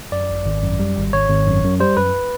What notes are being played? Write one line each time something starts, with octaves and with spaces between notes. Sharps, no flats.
F#2 D5
G#1
G#1
F#2
G3
G#1
G#1 C#5
G#1
F#2
F#2
G3 C5
F#2 B4